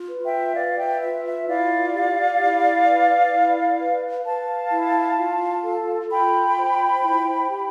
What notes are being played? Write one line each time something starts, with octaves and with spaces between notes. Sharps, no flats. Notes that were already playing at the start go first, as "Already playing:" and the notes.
Already playing: F4
B4
E5 G5
B4 D5 F5
E5 G5
F4 E5
E5
E4 D5 F5
G4
E4
B4
E4
B4
B4 F5 A5
E4
F4
A4
F4 G5 B5
C5
E4
G4